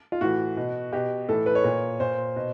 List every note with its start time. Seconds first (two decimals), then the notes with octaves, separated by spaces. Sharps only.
0.12 F4
0.21 A2 E3 F#4
0.57 B2
0.93 B2 G4
1.28 A2 E3 A4
1.46 B4
1.55 C#5
1.64 A#2
2.00 A#2 C5
2.36 B2